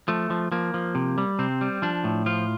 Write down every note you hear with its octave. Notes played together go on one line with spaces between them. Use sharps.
F3 A3
F3
F3 A#3
F3
C3
G3
C3 C4
G3
F3 D4
A2
F3 F4